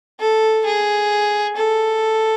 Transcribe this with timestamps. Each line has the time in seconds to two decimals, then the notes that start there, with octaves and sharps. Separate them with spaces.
0.20 A4
0.66 G#4
1.56 A4